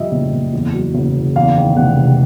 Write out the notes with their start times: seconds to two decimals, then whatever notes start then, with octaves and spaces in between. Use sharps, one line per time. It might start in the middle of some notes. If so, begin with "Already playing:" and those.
Already playing: F2 D3 G3 D#5 E5
0.12 F#1
0.33 F#1
0.54 E2
0.74 F#3
0.95 F#1
1.15 C#3
1.36 E2 F5
1.56 D#3
1.77 F1 F#5
1.97 C3